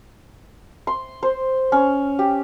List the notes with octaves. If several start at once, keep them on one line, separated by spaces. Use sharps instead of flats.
C6
C5
C#4
G4